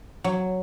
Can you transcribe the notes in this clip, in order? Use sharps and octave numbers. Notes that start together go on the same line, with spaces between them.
F#3